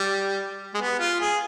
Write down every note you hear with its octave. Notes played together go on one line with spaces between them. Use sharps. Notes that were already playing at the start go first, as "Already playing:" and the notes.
Already playing: G3
G#3
B3
F4
G#4